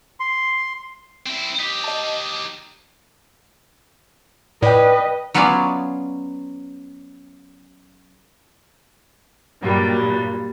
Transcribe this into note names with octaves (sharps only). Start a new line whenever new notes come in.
C6
C4 E4
D#4 G4 B6
D#5 A5
A2 B4 D5 D#5 G5
F#3 B3 C#4 F4 G#4 D5
G2 A#2 F#3 G3